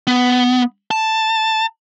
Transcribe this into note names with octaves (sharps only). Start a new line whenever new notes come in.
B3
A5